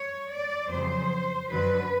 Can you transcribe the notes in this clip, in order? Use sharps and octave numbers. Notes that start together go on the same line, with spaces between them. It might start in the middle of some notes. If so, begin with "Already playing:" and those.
Already playing: C#5
D5
F2 C#3 F#3 C5
F#2 D3 F#3 B4